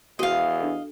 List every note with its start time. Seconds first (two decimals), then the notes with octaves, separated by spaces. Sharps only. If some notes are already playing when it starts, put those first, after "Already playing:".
0.19 E2 F#4 A#4 D#5 F5
0.60 D4 A4